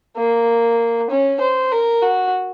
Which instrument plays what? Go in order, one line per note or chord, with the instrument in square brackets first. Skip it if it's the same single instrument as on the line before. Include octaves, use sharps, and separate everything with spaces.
[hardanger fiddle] A#3
C#4
C5
A#4
F#4